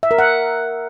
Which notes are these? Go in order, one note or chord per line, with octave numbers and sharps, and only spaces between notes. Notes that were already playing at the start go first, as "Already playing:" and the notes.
E5
A#4
F#5